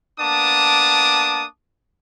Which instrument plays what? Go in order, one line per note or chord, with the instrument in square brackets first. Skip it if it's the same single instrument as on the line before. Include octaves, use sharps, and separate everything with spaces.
[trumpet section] A#3 B3 D4 A5 D6 D#6